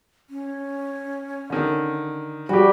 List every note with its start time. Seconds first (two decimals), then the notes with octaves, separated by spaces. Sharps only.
0.30 C#4
1.50 D3 D#3
2.49 G3 F#4 G4